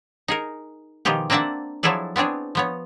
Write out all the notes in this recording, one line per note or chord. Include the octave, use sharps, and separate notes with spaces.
D#4 G#4 A#4
B2 D#3 F3 F4 G4 G#4
A#3 C4 D4 E5 F#5 A5
F3 F#3 E4 G#4 A4 D5
B3 C4 D4 G#4 C#5
F3 B3 C#5